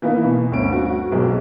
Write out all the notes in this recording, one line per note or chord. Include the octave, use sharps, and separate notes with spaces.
E3 A#3 B3 D#4
B2
G1 D2 C4 C#4 D7
F#4
B1 F#3 G#3